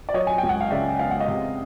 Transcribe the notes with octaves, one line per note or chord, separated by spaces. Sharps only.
D5
F#3 C#5 D#5
G#5
G5
C#2
F#5
F5
C#3 D5 E5
B3 F5
F#5
D#5 F5
C3